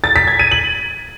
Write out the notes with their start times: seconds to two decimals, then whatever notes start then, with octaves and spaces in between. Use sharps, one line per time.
0.04 A6
0.16 B6
0.28 G#6
0.39 D#7
0.51 F#7